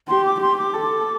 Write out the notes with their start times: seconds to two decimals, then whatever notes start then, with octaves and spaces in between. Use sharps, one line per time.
0.08 G4 C6
0.25 D6
0.41 G4 C6
0.57 D6
0.74 A4